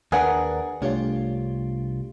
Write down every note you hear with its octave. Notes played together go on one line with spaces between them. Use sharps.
D#2 D4 G#4 A#4 B4 F#5
C2 A3 D4 F4 G4 C#5